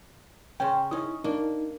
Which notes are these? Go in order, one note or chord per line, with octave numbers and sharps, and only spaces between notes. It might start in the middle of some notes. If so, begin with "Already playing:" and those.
C#3 C#4 G5 C6
C#4 D#4 E4 D#6
A#3 D4 D#4